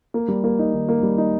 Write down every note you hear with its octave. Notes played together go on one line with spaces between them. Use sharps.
A#3
G3
A#3
D#4
D#3
A#3
G3
D#4